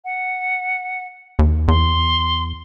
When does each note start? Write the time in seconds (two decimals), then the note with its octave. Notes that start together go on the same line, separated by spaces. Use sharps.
0.05 F#5
1.39 D#2
1.68 E2 C6